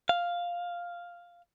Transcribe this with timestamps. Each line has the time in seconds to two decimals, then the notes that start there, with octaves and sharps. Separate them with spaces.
0.09 F5